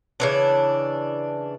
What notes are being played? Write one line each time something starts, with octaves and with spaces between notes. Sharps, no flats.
C#3 E3 D4